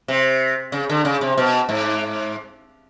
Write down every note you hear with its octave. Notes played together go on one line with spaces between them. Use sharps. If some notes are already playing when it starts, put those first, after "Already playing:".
C3
C#3
D3
C#3
C3
B2
G#2